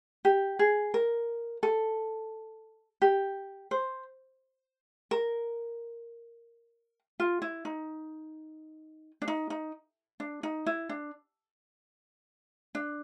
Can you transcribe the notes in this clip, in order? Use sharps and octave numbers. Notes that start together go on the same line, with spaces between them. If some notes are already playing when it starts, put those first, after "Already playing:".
G4
G#4
A#4
A4
G4
C5
A#4
F4
E4
D#4
D4
D#4
D#4
D4
D#4
E4
D4
D4